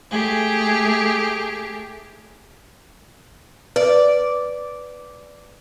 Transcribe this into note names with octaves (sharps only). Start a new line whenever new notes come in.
A3 G4 G#4
B4 D5